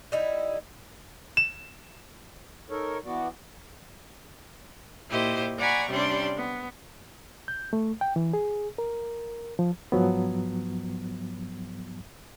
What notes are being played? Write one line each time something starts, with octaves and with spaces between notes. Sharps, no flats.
G3 D#4 E4
E7
D#4 A4 A#4 C#5
E3 B3 F#4 D5
A#2 E4 G4 C5 D#5
D5 F#5 G#5 A#5 B5 C#6
C3 G3 C#4 D4 D5 C6
B3
G6
A3
G5
E3
G#4
A#4
F3
G#2 F3 F#3 B3